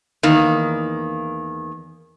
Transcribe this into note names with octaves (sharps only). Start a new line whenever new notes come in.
E2 D#3 A#3